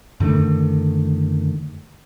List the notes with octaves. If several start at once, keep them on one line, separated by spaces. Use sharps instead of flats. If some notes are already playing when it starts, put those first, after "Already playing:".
F#2 D3 D#3 A3